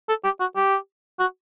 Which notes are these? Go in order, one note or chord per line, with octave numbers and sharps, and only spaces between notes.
A4
G4
F#4
G4
F#4